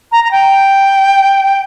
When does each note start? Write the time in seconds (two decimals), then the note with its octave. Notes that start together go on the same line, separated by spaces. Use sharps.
0.12 A#5
0.24 A#5
0.31 G5